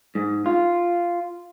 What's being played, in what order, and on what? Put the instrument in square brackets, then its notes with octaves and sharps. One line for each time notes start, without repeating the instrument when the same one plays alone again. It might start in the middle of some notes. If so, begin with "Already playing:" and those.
[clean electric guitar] G#2
F4